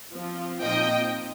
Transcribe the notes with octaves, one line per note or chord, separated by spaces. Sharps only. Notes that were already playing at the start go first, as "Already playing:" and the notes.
F3 C4 F4
A#2 F3 C4 D#4 D#5 G5